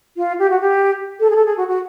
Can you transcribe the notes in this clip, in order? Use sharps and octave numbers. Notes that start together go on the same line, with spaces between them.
F4
G4
F#4
G4
A4
G#4
A4
G#4
F#4
F#4